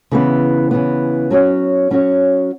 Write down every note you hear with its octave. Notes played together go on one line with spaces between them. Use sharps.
C#3 E3 B3
C#3 E3 B3
F#3 C#4 F#4 C#5
F#3 C#4 F#4 C#5